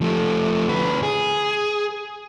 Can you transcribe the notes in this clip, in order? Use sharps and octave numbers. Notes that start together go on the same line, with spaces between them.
F3 A3
D2 B4
G#4